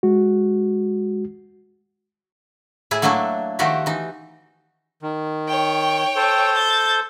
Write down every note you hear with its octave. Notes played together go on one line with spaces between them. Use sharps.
G#3 F#4
A2 E4 G#4
F#3 A3 A#3 D4 E4
D#3 F3 A3 F#4 G4
E3 D#4
D#3
C#5 G5
A4 C5
G6 A6